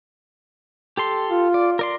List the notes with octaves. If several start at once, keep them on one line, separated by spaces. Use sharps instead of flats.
G4 A4 C6
F4
D5
A#4 D5 C6